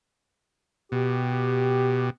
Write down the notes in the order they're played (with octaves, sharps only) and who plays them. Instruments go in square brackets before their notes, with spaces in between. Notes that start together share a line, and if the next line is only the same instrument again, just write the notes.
[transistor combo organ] B2 [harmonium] G4